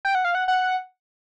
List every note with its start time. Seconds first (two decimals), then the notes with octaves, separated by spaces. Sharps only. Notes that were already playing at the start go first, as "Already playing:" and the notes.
0.05 G5
0.15 F#5
0.25 F5
0.35 F#5
0.48 F#5